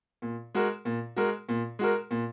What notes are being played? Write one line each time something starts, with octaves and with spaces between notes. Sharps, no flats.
A#2
G#3 F#4 A#4
A#2
G#3 F#4 A#4
A#2
G#3 F#4 A#4
A#2